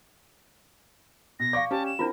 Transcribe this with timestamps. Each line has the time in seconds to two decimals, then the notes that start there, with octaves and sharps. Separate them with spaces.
1.40 B2 A#6
1.53 D5 F5 C#6 D6
1.71 C#4 G4 A5
1.86 E7
1.99 C4 D4 E4 F4 A#4